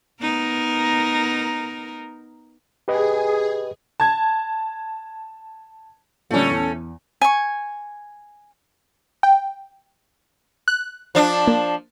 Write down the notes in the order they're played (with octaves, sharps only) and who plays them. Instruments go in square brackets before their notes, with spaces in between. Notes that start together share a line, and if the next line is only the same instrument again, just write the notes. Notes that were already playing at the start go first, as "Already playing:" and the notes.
[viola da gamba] B3 D#4 A#4
[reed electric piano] G4 B4 D#5 [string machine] G#4
[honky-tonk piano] A5 G#6
[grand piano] A#2 D3 G3 [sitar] A3 C#4
[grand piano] E2
[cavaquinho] G#5 C#6
[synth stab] G5
F#6
[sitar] F3 D4
[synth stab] A#3